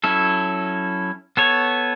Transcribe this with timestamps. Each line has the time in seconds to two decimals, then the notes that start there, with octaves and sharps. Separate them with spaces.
0.04 F#3 C#4 E4 A4
1.37 B3 A4 C#5